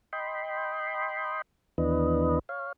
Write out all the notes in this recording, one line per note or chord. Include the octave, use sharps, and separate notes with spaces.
D#5 G5 B5 C6
D#2 E3 B3 D4 B4 D#5
C#5 F5